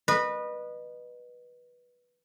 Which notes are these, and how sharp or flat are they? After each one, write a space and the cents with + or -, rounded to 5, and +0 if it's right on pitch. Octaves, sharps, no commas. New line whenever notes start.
B4 -15 D#5 -30